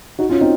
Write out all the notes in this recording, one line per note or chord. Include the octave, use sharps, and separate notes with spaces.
D#4 F#4
C#4 F4
C4 D#4